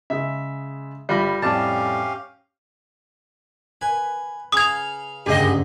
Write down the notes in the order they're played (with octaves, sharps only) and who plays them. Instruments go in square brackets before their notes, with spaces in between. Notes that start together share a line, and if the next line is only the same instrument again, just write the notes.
[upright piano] C#3 G#3 [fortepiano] E5
[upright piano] G1 A#6 [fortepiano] G3 F4 B5
[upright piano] F2 A2 G3 [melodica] C#4 G4 F5 [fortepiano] A5
[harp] B4 [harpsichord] G#5
[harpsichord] C#3 F5 [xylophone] D#6 G#6
[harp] F#1 G2 [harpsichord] D2 [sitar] G4 G#4 D#5